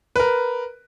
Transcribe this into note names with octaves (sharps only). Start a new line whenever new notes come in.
A#4 B4